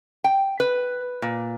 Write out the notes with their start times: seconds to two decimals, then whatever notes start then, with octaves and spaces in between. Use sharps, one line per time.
0.24 G5
0.60 B4
1.22 A#2